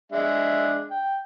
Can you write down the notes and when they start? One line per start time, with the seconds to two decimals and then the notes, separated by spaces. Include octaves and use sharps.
0.12 G#3 D4 E5
0.91 G5